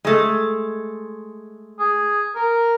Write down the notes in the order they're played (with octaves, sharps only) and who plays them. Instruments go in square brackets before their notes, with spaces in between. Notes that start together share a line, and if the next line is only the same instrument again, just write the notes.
[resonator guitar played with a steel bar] G#3 A3
[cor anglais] G#4
A#4